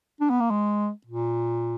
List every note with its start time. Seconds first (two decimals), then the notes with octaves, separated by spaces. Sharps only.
0.20 D4
0.30 B3
0.40 A#3
0.50 G#3
1.06 A#2